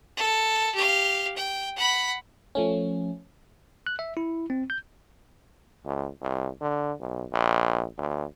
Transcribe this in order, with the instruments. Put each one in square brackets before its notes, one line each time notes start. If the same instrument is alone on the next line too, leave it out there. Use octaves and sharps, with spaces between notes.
[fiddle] A4
G4 F5
G5
F#5 B5
[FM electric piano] F3 A3 C#4
[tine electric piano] F#6
E5
E4
C4
G6
[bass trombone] C#2
C2
D3
B1
A#1
D2